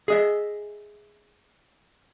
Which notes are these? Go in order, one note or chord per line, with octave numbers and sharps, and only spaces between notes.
G#4 D#5 E5